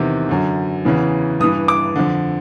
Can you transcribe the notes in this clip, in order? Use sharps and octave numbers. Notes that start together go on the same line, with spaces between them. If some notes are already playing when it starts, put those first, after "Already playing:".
Already playing: E2 C3 D#3
F#2 D3
E2 C#3 E3
G2 E3 D#6
D6
F2 D3